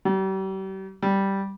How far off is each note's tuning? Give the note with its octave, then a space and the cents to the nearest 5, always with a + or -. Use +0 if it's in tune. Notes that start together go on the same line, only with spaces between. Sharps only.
G3 -40
G3 -5